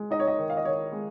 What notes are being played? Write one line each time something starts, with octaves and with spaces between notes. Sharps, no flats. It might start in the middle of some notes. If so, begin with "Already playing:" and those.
Already playing: G#3
D#4 D#5
C#5
D#5
D#3
F5
D#5
D#3 C#5
G#3